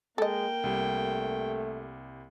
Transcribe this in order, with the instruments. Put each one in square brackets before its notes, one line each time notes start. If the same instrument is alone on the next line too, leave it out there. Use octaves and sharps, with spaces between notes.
[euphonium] G#3 [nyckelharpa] A#3 G5 [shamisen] A4 D#5
[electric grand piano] C2 G3 [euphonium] A3